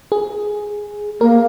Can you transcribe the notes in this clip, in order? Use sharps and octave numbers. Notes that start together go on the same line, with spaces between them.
G#4
A#3 A#4